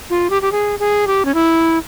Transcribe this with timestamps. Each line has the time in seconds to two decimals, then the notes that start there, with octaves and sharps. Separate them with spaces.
0.10 F4
0.30 G4
0.42 G4
0.52 G#4
0.79 G#4
1.07 G4
1.25 C#4
1.34 E4